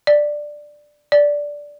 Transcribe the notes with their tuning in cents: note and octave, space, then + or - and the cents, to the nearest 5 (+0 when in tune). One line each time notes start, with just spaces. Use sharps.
D5 +10
D5 -5